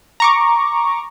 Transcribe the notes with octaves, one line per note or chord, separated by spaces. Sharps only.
A#5 C#6 D6